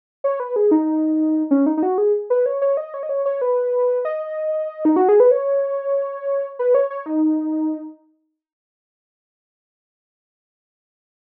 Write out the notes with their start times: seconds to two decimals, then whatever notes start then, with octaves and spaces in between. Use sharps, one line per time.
0.24 C#5
0.40 B4
0.56 G#4
0.71 D#4
1.51 C#4
1.66 D#4
1.77 D#4
1.83 F#4
1.98 G#4
2.30 B4
2.46 C#5
2.62 C#5
2.77 D#5
2.94 C#5
3.03 D#5
3.09 C#5
3.26 C#5
3.41 B4
4.05 D#5
4.85 D#4
4.96 F#4
5.09 G#4
5.20 B4
5.31 C#5
6.59 B4
6.75 C#5
6.90 C#5
7.06 D#4